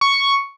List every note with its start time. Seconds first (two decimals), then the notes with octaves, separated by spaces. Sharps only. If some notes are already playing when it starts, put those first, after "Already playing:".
0.01 C#6